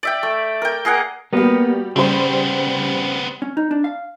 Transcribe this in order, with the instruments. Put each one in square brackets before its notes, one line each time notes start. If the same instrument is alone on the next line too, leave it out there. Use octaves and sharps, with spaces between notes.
[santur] D5 E5 G5
A3
A#4 G5
A#3 G#4 A#4 F#5
[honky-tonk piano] G3 F#4 G4 [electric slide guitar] A#3 B3
[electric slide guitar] C#3 [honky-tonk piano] G3 G4 C5 [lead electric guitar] B3 C4
[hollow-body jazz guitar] C#4
D#4
D4
F5